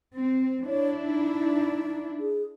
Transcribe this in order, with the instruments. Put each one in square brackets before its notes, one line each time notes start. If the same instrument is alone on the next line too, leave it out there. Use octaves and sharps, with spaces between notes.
[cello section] C4
[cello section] D4 E4 [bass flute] C#5
[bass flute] D#4
G#4